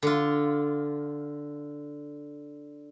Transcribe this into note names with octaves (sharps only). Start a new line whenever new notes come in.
D3 F4